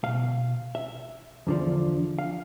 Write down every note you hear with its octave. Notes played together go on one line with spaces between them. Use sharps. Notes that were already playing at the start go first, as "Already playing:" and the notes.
C2 B2 F5
E5
E2 D3 F3
F5